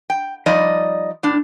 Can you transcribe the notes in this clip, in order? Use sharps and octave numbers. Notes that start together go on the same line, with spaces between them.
G5
F3 G3 D#4 D5 D#5
A2 D4